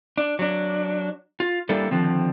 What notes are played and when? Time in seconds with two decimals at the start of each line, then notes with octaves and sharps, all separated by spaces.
0.18 D4
0.39 F#3 D4
1.40 F4
1.69 G3 A#3 D4 E4 A4
1.91 D3 D#3 F3 C4